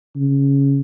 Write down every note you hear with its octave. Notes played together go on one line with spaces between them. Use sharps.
C#3